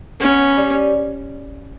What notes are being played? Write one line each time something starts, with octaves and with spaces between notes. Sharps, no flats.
B3 C#4
G3